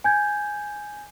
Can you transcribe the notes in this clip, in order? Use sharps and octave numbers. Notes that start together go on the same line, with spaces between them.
G#5 G6 G#6